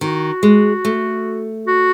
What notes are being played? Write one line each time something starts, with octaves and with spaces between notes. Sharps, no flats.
D#3 F#4
G#3
A3
F#4